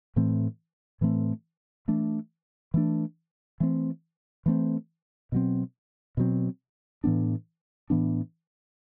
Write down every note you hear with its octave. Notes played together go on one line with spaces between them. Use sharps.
A2 E3 A3 C4
A2 E3 A3 C4
E3 A3 D4
E3 A3 D4
E3 A3 C4
E3 A3 C4
B2 F#3 C4
B2 F#3 C4
A2 E3 B3 D4
A2 E3 B3 D4